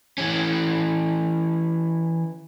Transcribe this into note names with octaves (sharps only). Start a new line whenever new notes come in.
E3 C#4